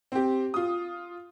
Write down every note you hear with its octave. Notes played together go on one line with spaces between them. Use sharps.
C4 G4
F4 D#6